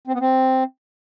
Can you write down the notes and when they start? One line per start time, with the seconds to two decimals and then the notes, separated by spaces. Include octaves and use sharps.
0.07 C4
0.14 B3
0.21 C4